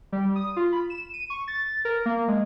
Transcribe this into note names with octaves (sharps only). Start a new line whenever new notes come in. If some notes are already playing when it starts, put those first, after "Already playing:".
G3
D#6
F4
B5
E7
D#7
C#6
A6
A#4
A#3
G#3